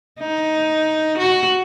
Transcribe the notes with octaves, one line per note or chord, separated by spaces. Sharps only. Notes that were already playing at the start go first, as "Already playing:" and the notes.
D#4
F#4